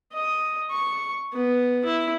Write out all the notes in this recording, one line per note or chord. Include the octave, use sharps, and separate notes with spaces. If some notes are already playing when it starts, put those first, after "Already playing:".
D#5
C#6
B3
E4